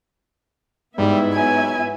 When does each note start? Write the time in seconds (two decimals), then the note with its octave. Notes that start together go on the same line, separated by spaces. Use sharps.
0.98 G#2 G3 B3 E4 E5
1.34 F#3 G#5